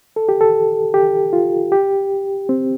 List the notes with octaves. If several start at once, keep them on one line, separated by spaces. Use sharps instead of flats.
A4
G4
A4
G4
F4
G4
C4